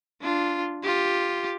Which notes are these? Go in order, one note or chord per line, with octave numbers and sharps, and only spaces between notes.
D4 F4
F4 G4